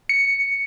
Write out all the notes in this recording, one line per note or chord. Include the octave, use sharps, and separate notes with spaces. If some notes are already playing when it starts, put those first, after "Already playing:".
C#7